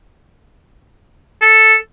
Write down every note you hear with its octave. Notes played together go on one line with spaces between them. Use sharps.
A4